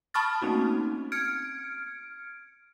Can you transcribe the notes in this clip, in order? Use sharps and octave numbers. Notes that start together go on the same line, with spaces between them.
A5 B5 C#6 D#6 F6 A6
A3 A#3 C4 C#4 D#4 F#4
F6 G#6 C#7 D7